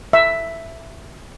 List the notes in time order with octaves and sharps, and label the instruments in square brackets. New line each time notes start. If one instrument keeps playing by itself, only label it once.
[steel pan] E5